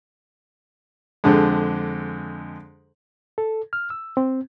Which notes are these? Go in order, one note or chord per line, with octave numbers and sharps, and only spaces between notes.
F2 D3 G#3
A4
F6
E6
C4